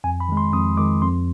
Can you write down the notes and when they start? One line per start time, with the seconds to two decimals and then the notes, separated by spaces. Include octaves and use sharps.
0.04 F2 G#5
0.20 B5
0.29 D#3 G#3
0.37 C6
0.53 F2 D#6
0.77 D#3 G#3 D6
1.02 F2 C6